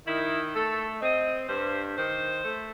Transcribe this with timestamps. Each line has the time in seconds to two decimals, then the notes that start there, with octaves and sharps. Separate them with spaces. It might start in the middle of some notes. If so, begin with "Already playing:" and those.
0.07 D#3 E4
0.55 A3 A4
1.01 C4 D#5
1.48 G2 C5
1.96 D#3 C5
2.43 A3